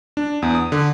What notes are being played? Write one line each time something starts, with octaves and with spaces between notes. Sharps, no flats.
D4
E2
D#6
D3